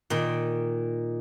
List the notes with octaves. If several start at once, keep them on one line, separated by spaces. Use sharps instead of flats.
A#2 D#3